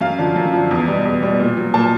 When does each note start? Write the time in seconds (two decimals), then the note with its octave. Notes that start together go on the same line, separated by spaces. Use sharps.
0.01 F#2 F5
0.18 D3 F3
0.36 F#2
0.52 D3 F3
0.71 E2
0.88 B2 G3
1.05 E2
1.22 B2 G3
1.40 A#2
1.57 F#3
1.74 A#2 A5